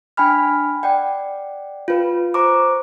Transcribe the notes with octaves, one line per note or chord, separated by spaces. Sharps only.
D4 G5 G#5 B5 F6
D5 F#5 G5
F4 B4
C5 A#5 C#6 D6